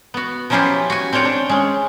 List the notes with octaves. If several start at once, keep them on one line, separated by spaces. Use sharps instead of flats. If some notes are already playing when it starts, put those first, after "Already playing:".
B3 F#4
F3 F#3 C#4 E4 F4 G4
F#4 G#5
C4 D4 F4 C#5 G5
D4
G#3 C#4